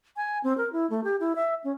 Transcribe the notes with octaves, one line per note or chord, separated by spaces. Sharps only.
G#5
C4
A#4
E4
A3
G4
E4
E5
C#4